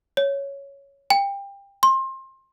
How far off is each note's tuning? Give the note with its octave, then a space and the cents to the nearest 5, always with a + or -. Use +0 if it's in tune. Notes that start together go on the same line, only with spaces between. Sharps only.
C#5 +5
G5 +25
C6 +25